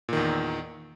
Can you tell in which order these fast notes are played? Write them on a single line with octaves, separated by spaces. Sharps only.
A#2 D#3 E2